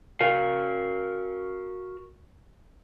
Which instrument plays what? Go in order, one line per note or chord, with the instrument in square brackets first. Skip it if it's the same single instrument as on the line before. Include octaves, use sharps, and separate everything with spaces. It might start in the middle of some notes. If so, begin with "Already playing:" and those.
[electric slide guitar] F#4 A#4 F5